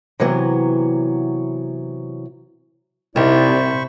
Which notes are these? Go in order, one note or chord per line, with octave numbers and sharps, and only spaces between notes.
C3 E3 F#3 B3
C2 C3 D#4 E4 C5 D5 B5 C#6